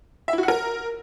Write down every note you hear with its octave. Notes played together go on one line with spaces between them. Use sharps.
E5
E4
F#4
F#5
A#4